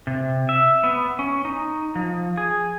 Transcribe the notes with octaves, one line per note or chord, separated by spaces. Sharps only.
C3
E5
B3
C#4
D#4
F3
G#4